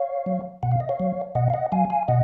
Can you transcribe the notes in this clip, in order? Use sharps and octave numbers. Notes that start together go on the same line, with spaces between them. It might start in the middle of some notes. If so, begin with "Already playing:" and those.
Already playing: C#5 F5
F#3
B2 F#5
F5
D#5
C#5 F5
F#3
B2 D#5 F#5
F5
D#5 F#5
F#3 F5 G#5
F5 G#5
B2 D#5 F#5